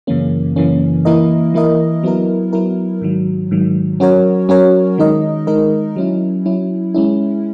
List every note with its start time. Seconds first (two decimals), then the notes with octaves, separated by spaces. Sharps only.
0.07 F#2 C#3 E3 A#3 C#4
0.56 F#2 C#3 E3 A#3 C#4
1.05 E3 A#3 E4 A#4 D#5
1.54 E3 A#3 E4 A#4 D#5
2.03 F#3 B3 E4 A#4
2.53 F#3 B3 E4 A#4
3.02 G#2 D#3 F#3
3.51 G#2 D#3 F#3
4.00 F#3 C#4 F#4 A#4 C#5
4.49 F#3 C#4 F#4 A#4 C#5
4.98 D#3 G#3 D#4 A#4 D#5
5.47 D#3 G#3 D#4 A#4 D#5
5.96 F#3 C#4 E4
6.46 F#3 C#4 E4
6.94 G#3 C#4 E4